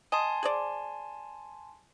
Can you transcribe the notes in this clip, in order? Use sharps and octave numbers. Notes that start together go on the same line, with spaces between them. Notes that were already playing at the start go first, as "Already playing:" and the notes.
D#5 G#5 A5 C6
G#4 C5 D5